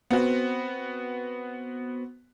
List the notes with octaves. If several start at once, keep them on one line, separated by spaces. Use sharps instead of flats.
B3 C4 F#4